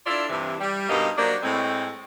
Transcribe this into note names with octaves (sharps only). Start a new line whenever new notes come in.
D4 E4 F4 A4 D5
G2 C3 E3
G3
G2 B2 A#3 D#4 G4 D#5
F#3 A#3 D4 G4 C5 D5
A2 G#3 C4